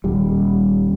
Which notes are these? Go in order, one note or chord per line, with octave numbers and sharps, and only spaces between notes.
D#1 G3